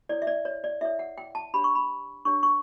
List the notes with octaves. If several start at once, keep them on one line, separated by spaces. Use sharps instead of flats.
E4 A4 C#5 D5
E5
D5
C#5
D5
E4 A4 C#5 E5
F#5
G5
A5
D4 G4 C#5 B5
C#6
B5
D4 G4 C#5 C#6
C#6